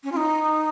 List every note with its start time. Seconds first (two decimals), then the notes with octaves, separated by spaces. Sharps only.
0.03 C#4
0.12 F4
0.17 D#4